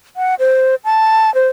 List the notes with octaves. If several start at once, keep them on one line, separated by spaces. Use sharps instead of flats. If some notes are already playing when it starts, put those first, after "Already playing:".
F#5
C5
A5
C5